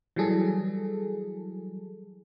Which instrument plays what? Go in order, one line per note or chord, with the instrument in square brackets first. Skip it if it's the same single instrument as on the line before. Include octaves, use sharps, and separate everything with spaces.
[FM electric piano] E3 F#3 G3 G#4 A4